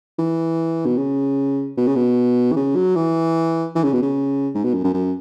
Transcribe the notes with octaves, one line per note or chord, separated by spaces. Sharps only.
E3
B2
C#3
B2
C#3
B2
E3
C#3
F#3
E3
E3
C#3
B2
C#3
G#2
B2
F#2
F#2
F#2